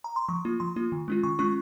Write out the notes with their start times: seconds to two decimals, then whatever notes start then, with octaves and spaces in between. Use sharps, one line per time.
0.04 A#5
0.16 C6
0.29 F3 C#6
0.45 A#3 F4
0.60 F3 C6
0.76 A#3 F4
0.92 D#3
1.08 G#3 C#4 F4
1.23 D#3 C#6
1.39 G#3 C#4 F4 C#6